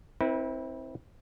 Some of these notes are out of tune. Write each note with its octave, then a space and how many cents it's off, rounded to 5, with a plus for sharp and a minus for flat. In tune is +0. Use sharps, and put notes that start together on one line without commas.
C4 +10 E4 -25 B4 -35